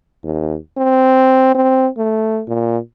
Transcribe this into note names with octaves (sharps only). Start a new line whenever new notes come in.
D#2
C4
C4
A3
A#2